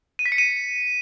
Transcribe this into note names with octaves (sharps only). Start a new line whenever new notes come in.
D#7
B6
C#7
D#7